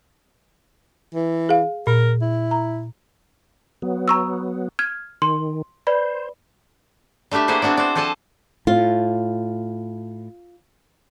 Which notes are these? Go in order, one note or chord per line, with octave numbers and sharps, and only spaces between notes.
E3
G#4 F5
A#2 A#4
E4
A#5
F#3 B3
A#5 C#6 E6
F6 G#6
D#3 C6
B4 C5 D5 B5
G3 A3 D4 G4 E5
A#3 E4 F#4 G#4 C5 D5
B3 C4 D4 F#4 D5
C5 D5
F3 A4 C5 D5 G#5 A5
A2 F4